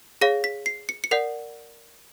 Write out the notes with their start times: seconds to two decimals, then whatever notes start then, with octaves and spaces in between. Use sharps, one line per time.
0.21 G#4 C#5 F5 A#6
0.44 B6
0.66 C7
0.89 C#7
1.04 C#7
1.11 A#4 D5 F#5 C7